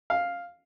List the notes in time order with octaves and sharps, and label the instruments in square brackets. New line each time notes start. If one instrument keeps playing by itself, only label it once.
[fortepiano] F5